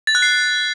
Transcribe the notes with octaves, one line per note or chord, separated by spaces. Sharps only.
A6
F#6
C7